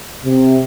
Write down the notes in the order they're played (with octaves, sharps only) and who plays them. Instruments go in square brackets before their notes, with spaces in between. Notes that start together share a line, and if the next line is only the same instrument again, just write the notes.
[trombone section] C3